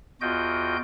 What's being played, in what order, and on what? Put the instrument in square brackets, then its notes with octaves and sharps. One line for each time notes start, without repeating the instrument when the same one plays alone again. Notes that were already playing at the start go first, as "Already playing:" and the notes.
[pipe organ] E2 F4 F#4 D#5 G5 G6